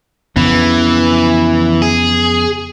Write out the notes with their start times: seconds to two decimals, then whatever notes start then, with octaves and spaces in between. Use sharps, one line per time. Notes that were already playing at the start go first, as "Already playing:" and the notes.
0.36 F2 C#3 E3 B3
1.82 G#4